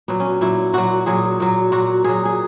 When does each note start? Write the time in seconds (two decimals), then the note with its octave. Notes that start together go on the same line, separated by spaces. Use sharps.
0.08 A#2 F#3 B3
0.20 C#4
0.41 A#2 F#3 E4
0.73 A#2 F#3 F#4
1.06 A#2 F#3 G#4
1.40 A#2 F#3
1.72 A#2 F#3 F#4
2.04 A#2 F#3 G#4
2.25 G#4